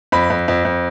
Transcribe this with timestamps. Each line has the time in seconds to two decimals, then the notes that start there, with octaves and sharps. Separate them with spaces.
0.12 F2 B5
0.30 F2
0.48 F2
0.65 F2